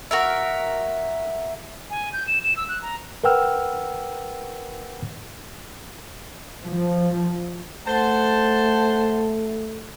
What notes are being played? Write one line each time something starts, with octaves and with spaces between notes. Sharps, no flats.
F#4 A#4 E5
G#5
G6
E7
E7
E6
F#6
A#5
A#4 B4 F#5 G5 E6 F6
F3
A3 C5 F#5 A5